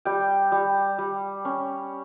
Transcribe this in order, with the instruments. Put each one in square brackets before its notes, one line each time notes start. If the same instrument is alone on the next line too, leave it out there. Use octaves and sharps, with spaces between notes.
[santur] G3 G5
G3
G3
C#4